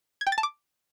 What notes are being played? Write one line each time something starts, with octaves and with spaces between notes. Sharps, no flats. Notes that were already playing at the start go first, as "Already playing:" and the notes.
G#6
G5
A6
A5
D6